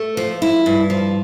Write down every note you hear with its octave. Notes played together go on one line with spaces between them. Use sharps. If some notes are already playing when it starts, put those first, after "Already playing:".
Already playing: A3
F3
E4
G2
F3